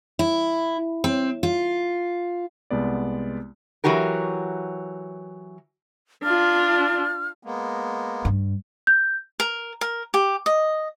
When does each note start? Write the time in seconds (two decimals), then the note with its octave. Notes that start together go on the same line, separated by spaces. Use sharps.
0.19 E4
1.04 C4
1.43 F4
2.70 C2 G#3 B3 D5
3.84 E3 F#3 F#4 G4 A#4
6.24 D4 F4 F6
7.43 G#3 A#3 B3
8.25 G2
8.87 G6
9.40 A#4
9.81 A#4
10.14 G4
10.46 D#5